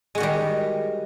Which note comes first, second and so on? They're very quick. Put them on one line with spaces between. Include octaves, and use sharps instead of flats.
G#3 F#4 D#3 G3